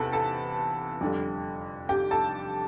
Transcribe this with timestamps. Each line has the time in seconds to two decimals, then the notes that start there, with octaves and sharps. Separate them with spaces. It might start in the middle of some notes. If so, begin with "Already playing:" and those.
Already playing: E2 C3 A4 B4 G5 A5 B5
0.12 A4 A5
1.01 F2 D3 G3
1.89 G4 G5
2.11 A4 A5